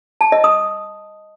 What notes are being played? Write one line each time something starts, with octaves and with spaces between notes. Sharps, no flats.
A5
D#5
D#6